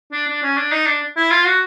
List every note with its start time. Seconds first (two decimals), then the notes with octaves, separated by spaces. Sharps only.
0.12 D4
0.27 D4
0.43 C#4
0.57 D4
0.72 D#4
0.87 D4
1.17 E4
1.31 F4
1.46 F#4